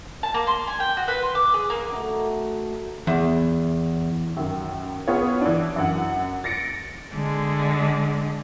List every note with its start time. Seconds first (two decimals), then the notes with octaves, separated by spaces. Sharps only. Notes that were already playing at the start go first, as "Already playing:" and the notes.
0.23 A5
0.34 A#3
0.47 C6
0.67 G#5
0.80 G5
0.97 F#4
1.08 B4
1.22 C6
1.35 D6
1.54 G#4
1.70 A#3
1.90 A3 D#4 F#4
3.07 E2
4.37 F#2 D#3
5.08 B3 F4 G#4 C#5
5.41 E3 D4
5.76 F#2 F#5
6.44 A6 A#6 C#7 D7
7.13 D3 G#3